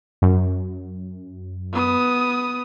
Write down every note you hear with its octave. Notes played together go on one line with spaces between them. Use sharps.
F#2
B3 D#6